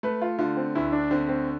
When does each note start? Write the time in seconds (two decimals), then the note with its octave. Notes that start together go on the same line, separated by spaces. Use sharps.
0.03 A3 B4
0.22 F4
0.39 D3 F4
0.57 C4
0.75 D2 E4
0.92 D4
1.11 D3 C4
1.28 C4